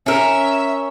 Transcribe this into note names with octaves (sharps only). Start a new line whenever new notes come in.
C#4 A#4 E5